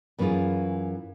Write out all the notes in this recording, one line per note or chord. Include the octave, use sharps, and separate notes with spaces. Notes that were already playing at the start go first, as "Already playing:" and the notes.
F#2 E3 C#4 D#4 F4 G#4